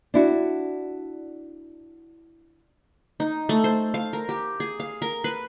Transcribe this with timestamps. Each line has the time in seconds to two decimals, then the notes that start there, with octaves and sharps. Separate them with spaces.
0.14 D4 E4 F#4
3.20 D#4
3.49 A3
3.64 C5
3.94 F5
4.13 A#4
4.29 G4
4.60 G#4
4.80 F5
5.02 A#4
5.24 B4